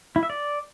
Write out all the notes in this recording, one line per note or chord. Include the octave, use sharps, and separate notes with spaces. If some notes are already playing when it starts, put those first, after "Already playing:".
E4
E5
D5